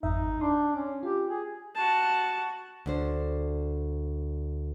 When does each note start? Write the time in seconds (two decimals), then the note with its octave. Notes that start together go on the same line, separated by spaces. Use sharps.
0.03 G#1 F2 D#4 E5
0.41 D4 C6
0.76 C#4
1.03 F4 G4
1.29 G#4
1.75 F#4 A5
2.86 D2 D4 C5